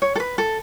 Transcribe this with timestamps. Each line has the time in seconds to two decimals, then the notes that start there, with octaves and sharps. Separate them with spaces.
0.02 C#5
0.16 A4
0.20 B4
0.38 A4